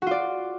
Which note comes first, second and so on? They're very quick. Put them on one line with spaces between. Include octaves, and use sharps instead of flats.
F#4 F4 D5